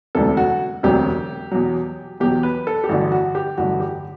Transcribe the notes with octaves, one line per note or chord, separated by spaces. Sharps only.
E1 D2 C3 F#3 A4
F#4
E1 D2 C3 F#3 G4
E2 B2 F#3
E2 B2 F#3 G4
B4
A4
G4
A1 G2 D3 F#3 F#4
F#4
G4
A1 G2 D3 F#3 F#4
G4